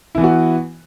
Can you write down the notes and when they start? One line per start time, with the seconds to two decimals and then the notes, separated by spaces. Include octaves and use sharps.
0.15 E4
0.18 E3
0.21 B3
0.24 F#4